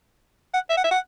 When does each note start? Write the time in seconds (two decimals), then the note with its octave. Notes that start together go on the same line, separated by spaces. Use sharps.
0.54 F#5
0.70 E5
0.77 F#5
0.84 E5
0.91 F#5